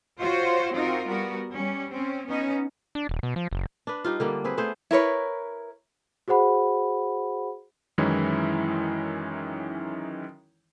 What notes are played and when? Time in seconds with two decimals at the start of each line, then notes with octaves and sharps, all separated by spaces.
0.20 F4 F#4 C5 C#5
0.75 C4 D#4 F4 F#4 A#4
1.07 G3 B3 F#4 A#4
1.51 G3 C#4
1.90 C4 C#4
2.27 B3 C#4 D#4
2.95 D4
3.09 D#1
3.23 B2
3.36 F3
3.51 F#1
3.87 D4 B4
4.04 G3 D#4 F4
4.20 D3 G3 A#3
4.44 C4 G#4 B4
4.57 A3 B3 G#4 C5
4.91 E4 A#4 B4 C#5
6.28 F#4 G#4 C5 F#5 B5
7.98 F#2 D#3 E3 G#3 C#4 E4